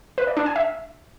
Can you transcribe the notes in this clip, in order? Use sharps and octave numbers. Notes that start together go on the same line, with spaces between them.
B4
D5
D4
G#5
E5